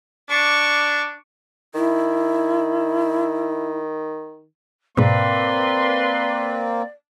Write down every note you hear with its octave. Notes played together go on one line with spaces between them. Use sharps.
D4 C#6 D6
D#3 E4
G#2 B2 A#3 C4 B4 D5 C6